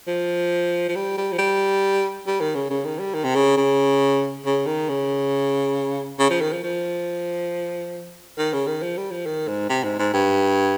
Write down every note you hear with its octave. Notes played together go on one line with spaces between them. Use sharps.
F3
F3
G3
G3
F3
G3
G3
D#3
C#3
C#3
D#3
G3
D#3
C3
C#3
C#3
C#3
D#3
C#3
C#3
F3
D#3
F3
F3
D#3
C#3
D#3
F3
G3
F3
D#3
G#2
C3
G#2
G#2
G2